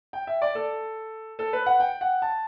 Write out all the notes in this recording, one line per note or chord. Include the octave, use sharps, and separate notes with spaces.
G5
E5
D5
A4
A4
B4
F#5
G5
F#5
A5